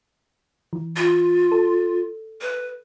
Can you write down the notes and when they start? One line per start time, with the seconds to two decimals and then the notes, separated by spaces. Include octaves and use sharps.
0.73 E3
0.96 F4
1.52 A4
2.41 B4